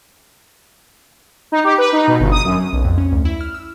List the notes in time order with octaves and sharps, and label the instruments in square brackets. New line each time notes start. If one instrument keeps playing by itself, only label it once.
[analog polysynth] D#4
G4
B4
D#4
B2
G1
D#6
F#2
[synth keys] B1
F2
C#4
D2
E4
F6
E6